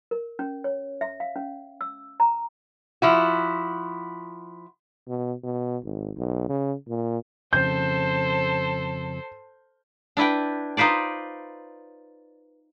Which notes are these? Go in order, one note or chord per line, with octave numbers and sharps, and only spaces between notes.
A#4
C#4
C#5
E5
F5
C#4
E6
A#5
F3 E4 F#4
B2
B2
G#1
B1
C#3
A#2
F2 C#3 A4 C5 G6
D4 E4 B4 G5
D#4 F4 B4 C5 D5